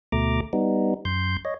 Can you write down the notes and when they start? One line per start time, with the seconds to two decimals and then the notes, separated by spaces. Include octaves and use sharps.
0.12 D2 B2 A3 A#5 D6
0.53 G3 B3 D#4
1.05 F#2 C6 G6
1.45 C#5 D#5